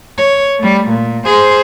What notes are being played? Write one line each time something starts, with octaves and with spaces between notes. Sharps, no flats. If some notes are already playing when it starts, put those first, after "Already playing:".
C#5
G3 A3
A#2
G#4 C5